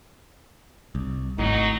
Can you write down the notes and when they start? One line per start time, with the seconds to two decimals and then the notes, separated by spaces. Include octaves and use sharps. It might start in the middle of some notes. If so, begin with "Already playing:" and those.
0.95 C2
1.38 G#1 A2 F#3 D#4